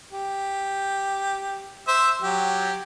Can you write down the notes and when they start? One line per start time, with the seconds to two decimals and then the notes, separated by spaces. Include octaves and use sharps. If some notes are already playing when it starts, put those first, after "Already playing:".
0.11 G4
1.88 C5 E5
2.22 F#3 G4